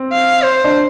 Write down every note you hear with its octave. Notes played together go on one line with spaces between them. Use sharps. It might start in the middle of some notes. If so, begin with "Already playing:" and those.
Already playing: C4
F5
C5
D4